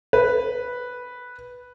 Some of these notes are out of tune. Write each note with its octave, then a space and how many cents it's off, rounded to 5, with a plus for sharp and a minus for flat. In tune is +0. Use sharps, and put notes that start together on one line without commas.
B4 -5